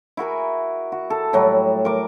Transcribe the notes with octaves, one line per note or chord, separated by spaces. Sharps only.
E4 F#4 A#4 G#5
F#4
A4
A2 F#3 G3
A#4 D6